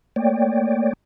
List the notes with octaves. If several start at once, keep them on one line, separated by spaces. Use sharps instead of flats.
A3 A#3 C#5 D5 G5